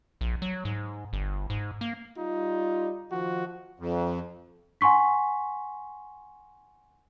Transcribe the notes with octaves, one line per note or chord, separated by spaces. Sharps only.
A#1
F#3
G#2
G1
G#2
A#3
G3 D#4 F4
D#3 F3 F#4
F2
F#5 G#5 C6 C#6 B6